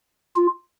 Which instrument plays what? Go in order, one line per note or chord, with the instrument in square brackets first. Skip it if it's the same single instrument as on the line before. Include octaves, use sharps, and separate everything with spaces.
[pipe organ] F4